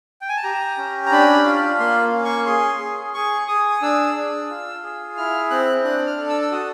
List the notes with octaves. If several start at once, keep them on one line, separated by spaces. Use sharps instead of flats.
G5
G#5
A5
G4 A#5
C#4
A#5
D4 B5
F4
A#3 C6
C#4
C#6
G#4 C6
G#4
G#4 C#6
G#4 D#6
D#6
D4 E6
D4
F4
G#4
E4 F6
C4 F#6
D4 F#6
F6
A4
E6
E6
F#4 D#6